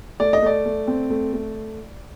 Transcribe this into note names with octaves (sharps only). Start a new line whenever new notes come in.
A3 D5
D#5
A3 D5
A3
C4
A3
A3